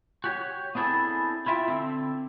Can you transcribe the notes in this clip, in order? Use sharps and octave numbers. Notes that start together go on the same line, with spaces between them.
F#4 G4 C#5
B3 C4 D4 E4 G#4 A4
E4 F4 E5 G5
D3 C4 A4